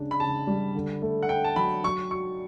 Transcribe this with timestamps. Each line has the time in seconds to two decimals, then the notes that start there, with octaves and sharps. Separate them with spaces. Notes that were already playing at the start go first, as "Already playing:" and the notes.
Already playing: C#3 D4
0.11 B5
0.20 C#3 A5
0.47 G3
0.75 D3
1.02 A3
1.23 F#5
1.29 D4 G5
1.44 A5
1.56 F#3 B5
1.84 F#3 C#6
2.11 F#4 C#6